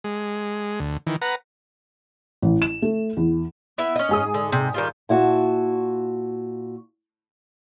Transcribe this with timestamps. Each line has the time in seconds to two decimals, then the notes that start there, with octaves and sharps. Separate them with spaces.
0.04 G#3
0.80 D2
1.07 D#3 E3
1.22 B4 F#5 A#5
2.42 A1
2.62 E7
2.82 A3
3.17 E2
3.78 B3 E4 E5
3.96 C#4 D#5
4.09 G#2 G#4 D#6
4.34 D3
4.52 C3
4.74 D#3 G3 F4
5.09 A#2 E4 F#4 A5